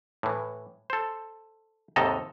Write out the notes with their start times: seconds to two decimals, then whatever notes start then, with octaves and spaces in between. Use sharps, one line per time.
0.23 A2 E3
0.90 A4 C5
1.96 D#2 G#2 C3 A4 D#5 A#5